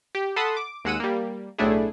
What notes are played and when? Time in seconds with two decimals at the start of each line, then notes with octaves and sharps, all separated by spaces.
0.15 G4
0.36 A4 F#5 A5 B5 C6 D#6
0.57 D6
0.85 D#2 G#3 F#5 E6 D#7
1.00 G3 A#3
1.58 B1 A2 A3 D4 E4 G#4